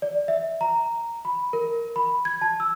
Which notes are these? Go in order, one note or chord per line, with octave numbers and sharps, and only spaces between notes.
D5
E5
A#5
B5
A#4
B5
G#6
A5
E6